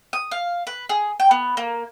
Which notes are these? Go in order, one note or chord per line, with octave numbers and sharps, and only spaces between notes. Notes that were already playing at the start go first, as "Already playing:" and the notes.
D#6
F5
B4
G#4
G5
B3
A#3